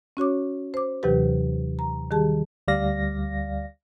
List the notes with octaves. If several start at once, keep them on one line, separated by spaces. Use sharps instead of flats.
C#4 F#4 C#5 D6
C5 D6
D#2 C3 E3 F#3 G4 B4
A#5
D#3 G3 G4 G#4 A5
D2 G3 D5 F5 A#6